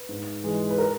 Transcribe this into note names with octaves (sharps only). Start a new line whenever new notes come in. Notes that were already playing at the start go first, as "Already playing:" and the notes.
Already playing: B4
G#2
E3 G#3
B4
A#4